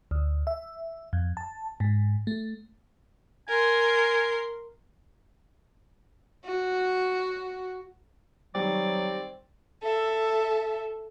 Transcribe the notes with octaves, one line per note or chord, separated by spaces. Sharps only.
D2
E5
F2
A5
G#2
A3
A#4 G#5 C6
F#4
D#3 F#3 G3 C4 D5
A4 E5